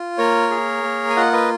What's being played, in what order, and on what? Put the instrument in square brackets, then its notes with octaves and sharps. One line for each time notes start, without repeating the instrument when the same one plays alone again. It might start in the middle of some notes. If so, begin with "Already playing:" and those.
Already playing: [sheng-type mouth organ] F4
A#3 A#4 C#5
G#4
A#3
G#5
F4 D#5 F#5
B4 D#5